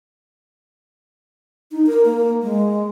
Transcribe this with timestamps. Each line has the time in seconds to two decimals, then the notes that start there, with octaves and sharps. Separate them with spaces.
1.72 D#4
1.87 A#4
2.05 A#3
2.42 G#3